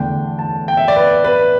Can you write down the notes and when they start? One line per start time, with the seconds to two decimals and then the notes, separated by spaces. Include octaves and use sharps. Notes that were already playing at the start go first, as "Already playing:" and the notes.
Already playing: E2 D3 A3 D4 G5
0.39 A5
0.68 G5
0.77 E5
0.88 D5
0.96 B4
1.24 B4